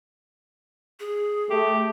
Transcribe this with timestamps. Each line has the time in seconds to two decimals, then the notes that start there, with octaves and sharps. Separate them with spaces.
1.00 G#4
1.50 A3 G4